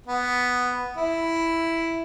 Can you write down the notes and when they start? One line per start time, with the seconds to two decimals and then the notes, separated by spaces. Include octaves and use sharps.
0.06 B3
0.97 E4